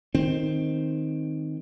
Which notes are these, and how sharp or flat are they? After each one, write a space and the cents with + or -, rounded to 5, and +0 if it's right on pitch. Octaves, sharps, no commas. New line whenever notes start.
D#3 +0 C4 +0